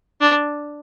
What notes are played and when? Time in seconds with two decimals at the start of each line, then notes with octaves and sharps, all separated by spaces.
0.21 D4